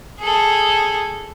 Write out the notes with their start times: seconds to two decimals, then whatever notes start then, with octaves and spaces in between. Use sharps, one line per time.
0.19 G#4 A4